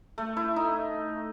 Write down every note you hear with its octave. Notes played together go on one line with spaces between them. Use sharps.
A3
E4
D#4